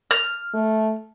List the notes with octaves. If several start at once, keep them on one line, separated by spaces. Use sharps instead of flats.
F6
A3